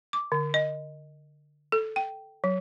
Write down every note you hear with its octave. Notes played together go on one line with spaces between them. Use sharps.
D6
D3
D#5
A4
G5
F#3